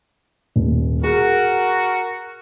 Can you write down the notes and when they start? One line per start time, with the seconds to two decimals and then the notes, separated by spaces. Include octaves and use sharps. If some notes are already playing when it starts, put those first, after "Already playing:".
0.56 D#1
1.03 F#4 G#4 A#4